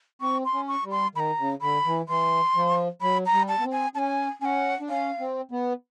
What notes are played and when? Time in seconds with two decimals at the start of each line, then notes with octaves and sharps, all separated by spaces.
0.21 C4 C#6
0.45 C6
0.53 C#4
0.68 C#6
0.84 G3
0.91 C6
1.15 D#3 B5
1.20 A#5
1.39 C#3
1.61 D3 B5
1.85 E3
2.08 E3 C6
2.55 F3
3.01 F#3 B5
3.26 A#5
3.33 G3
3.48 A5
3.59 B3
3.64 C4
3.72 G#5
3.95 C#4 G#5 A5
4.41 C#4 F#5 G#5
4.80 D4
4.89 C#4 F5
5.20 C4
5.51 B3